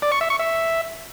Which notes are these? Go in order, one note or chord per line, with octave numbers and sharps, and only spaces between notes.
D5
C#6
E5
C#6
E5